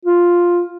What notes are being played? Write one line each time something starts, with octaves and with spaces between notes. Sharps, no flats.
F4